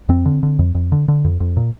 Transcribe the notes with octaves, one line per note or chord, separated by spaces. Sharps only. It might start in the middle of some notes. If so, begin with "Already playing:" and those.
F2 C4
D3
D3
F2
F2
D3
D3
F2
F2
A#2